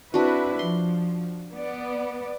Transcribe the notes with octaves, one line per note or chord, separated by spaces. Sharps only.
C4 D4 E4 F#4 B4
F3 C6
B3 D5